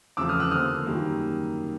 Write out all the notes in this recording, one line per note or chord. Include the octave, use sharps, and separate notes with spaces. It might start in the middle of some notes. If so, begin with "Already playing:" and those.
E2 C#3 F3 A3 C4 D6 E6
D#6 F6
E6 F#6
D3 F3 A#3 D#6 F6
F#2 D#3 G3 A#3